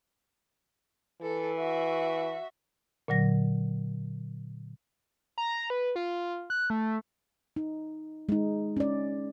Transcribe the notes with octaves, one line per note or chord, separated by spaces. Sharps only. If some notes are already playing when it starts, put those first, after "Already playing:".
E3 A4
F#4 E5
A#2 D3 F#3 A#6
A#5
B4
F4
F#6
A3
D#4
G#3 D#4
C#4 D5